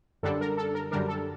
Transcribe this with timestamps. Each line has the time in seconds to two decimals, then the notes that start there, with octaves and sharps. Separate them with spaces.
0.23 F#2 D3 G3 D4 A4
0.41 A#4
0.57 A4
0.75 A#4
0.91 F#2 D3 G3 D4 A#4
1.08 A4